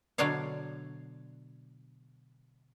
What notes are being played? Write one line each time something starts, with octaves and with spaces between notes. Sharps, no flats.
B2 D3 F#3 D4 C#5 F5